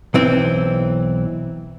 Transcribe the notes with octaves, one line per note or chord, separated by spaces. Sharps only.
B1 E3 C4